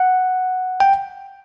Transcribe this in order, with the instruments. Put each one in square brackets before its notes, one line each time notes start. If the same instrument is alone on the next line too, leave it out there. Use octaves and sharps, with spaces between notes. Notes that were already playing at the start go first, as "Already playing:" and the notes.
Already playing: [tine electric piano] F#5
G5